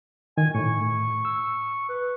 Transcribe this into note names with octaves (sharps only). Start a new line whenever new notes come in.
D#3 G#5
A2 C#6
E6
B4